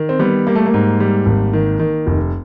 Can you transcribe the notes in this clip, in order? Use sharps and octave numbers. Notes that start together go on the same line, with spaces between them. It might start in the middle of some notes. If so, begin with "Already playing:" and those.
Already playing: D#3
C4
G3 B3
G3 A#3
A3
A#3
G#2
G3
G#1
D#3
D#3
F1